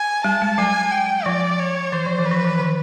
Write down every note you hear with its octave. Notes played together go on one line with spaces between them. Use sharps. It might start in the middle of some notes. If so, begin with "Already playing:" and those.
Already playing: G#5
G3 A5
G#3
F#3 G#5
G5
F3 D5
C#5
E3 C5
F3
E3
B4
F3
E3
D#3